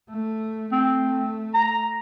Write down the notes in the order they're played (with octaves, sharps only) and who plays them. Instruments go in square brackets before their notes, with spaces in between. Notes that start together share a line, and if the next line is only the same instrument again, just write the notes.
[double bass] A3
[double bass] A3 [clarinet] C4
[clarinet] A#5